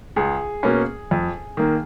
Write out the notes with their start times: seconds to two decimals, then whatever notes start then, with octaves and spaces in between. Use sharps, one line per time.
0.16 C#2 G#4
0.63 B2 A#3 C#4
1.11 F2
1.57 D#3 A#3